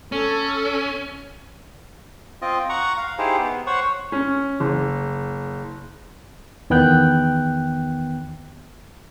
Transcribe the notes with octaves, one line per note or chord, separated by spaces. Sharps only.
C#4 A4
C4 F4 D#5
F#5 A#5 C#6
F5
D#4 E4 G4 G#4 C5
B3
C5 C#5 F#5 C#6
C#4
F#1
E2 D#3 B3 G5 F#6 G6